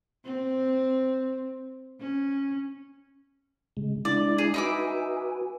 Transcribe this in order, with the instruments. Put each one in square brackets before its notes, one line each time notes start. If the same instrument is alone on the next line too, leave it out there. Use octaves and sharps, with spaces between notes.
[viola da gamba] C4
C#4
[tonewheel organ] C#3 G#3
[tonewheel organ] G#3 D4 E4 [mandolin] D5
[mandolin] G#4
[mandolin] D#4 E4 D6 [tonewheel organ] F#4 B4 G#5